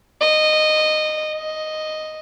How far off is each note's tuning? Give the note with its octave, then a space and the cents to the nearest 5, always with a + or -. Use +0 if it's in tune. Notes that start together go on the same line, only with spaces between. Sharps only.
D#5 -15
D#5 +0